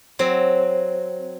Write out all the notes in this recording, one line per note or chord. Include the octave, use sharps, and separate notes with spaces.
F#3 C4